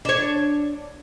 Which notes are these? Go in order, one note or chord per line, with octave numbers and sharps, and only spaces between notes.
D4 C#5